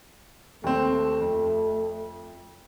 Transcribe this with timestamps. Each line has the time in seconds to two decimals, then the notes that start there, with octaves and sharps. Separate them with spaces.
0.64 D#2 A3 C4
1.21 F2